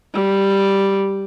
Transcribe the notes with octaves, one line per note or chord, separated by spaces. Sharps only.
G3